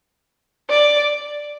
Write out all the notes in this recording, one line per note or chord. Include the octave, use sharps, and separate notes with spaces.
D5